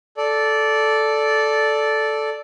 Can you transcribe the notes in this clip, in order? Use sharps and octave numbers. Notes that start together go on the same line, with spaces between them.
A4 D5